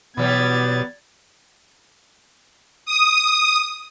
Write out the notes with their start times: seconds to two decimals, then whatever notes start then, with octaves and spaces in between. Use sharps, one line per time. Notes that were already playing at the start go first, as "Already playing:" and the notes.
0.17 B2 E3 F#3 G3 B3 G#6 A6
2.86 D#6